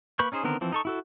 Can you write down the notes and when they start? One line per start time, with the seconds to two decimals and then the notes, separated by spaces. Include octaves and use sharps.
0.19 A#3 B4 B5 C#6 G6
0.32 C#4 D#4 G#4 C5
0.44 D3 D#3 B3 C4 A#4
0.61 E3 F3 C4
0.72 D#4 A4 C#6
0.85 E4 F#4 A4